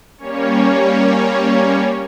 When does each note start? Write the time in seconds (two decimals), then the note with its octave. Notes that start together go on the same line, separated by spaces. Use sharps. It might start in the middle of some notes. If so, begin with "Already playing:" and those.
0.18 G3 A#3 C#4 C#5